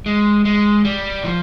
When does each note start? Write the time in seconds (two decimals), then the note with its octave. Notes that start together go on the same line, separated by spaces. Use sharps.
0.06 G#3
0.45 G#3
0.85 G3
1.24 F3